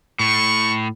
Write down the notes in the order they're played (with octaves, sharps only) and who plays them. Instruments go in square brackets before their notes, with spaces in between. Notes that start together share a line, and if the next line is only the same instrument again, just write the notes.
[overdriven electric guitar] A2 [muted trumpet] C#6